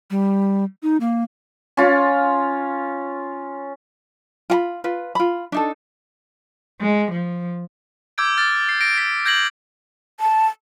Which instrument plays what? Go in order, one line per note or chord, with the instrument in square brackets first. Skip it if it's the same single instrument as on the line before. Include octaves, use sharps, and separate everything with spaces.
[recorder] G3
D#4
A#3
[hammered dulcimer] C#4 F4
[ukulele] F4 F#5 B5
F4 B4
F4 B5
D4 D#4 A4
[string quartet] G#3
F3
[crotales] D6 E6 G6 G#6 D7
F6 A6
C7
A#6 D7
B6 D7
G6 G#6 A#6 C7 F#7
[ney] A5